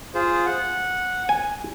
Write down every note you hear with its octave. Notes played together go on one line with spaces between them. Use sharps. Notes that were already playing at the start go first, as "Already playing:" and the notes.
F4 G#4 C5
F#5
G#5